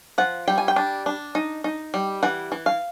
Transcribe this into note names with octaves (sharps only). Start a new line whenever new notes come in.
F3 F#5
G3 G5
G#5
G5
D4
D4
D#4
D#4
G3
E3 F#5
E3
F5